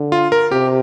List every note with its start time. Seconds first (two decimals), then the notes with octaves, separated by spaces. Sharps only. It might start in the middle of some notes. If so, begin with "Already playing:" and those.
Already playing: D3
0.12 F4
0.32 A#4
0.51 C3 G4